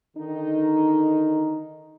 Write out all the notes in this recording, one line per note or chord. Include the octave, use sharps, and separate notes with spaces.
D3 D#3 D#4